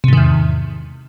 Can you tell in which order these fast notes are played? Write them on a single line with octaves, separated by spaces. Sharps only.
C3 G#2 D#3 E2